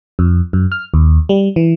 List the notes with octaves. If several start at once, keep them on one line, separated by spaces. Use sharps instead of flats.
F2
F#2
F6
D#2
G3
E3